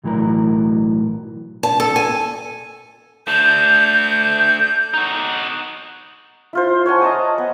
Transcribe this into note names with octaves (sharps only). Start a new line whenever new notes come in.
B1 A2 E3 F#3 A#4
A5
A4
G#5
A3 D4 G6
D#4 F#4
E4 F4 C5
C#5 F#5 G#5 A5
D#5 A5 A#5 D#6
B3